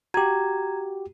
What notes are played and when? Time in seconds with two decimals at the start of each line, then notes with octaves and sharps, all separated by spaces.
0.14 F#4 G4 A#5 G#6